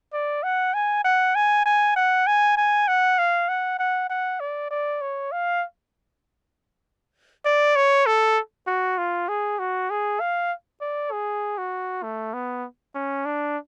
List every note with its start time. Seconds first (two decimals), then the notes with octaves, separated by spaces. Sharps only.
0.13 D5
0.43 F#5
0.74 G#5
1.05 F#5
1.35 G#5
1.66 G#5
1.96 F#5
2.27 G#5
2.57 G#5
2.88 F#5
3.19 F5
3.49 F#5
3.79 F#5
4.10 F#5
4.40 D5
4.71 D5
5.01 C#5
5.32 F5
7.45 D5
7.76 C#5
8.07 A4
8.67 F#4
8.98 F4
9.29 G#4
9.59 F#4
9.90 G#4
10.20 F5
10.81 D5
11.12 G#4
11.58 F#4
12.03 A3
12.34 B3
12.95 C#4
13.26 D4